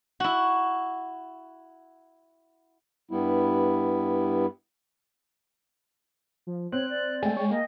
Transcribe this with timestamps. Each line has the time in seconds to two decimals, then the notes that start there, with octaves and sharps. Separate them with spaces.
0.20 E4 F#4
3.11 G2 G3 B3 E4
6.47 F3
6.72 C4 C#5 F#6
6.89 D5
7.23 G#3 A3 G5 G#5
7.37 C#5
7.51 A#3 D#5